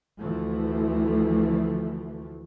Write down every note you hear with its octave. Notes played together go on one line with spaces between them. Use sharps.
D2 E3 F3 A3